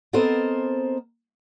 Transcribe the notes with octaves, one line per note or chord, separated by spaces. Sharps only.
B3 C4 A4 A#4 C5 D#5